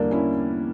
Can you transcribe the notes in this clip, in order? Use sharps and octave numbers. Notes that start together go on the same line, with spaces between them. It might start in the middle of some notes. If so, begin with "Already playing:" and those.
Already playing: E2 D3 G3 A#3 D4
C#4 E4